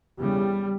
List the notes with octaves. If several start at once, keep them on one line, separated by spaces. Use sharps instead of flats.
E2 C#3 G3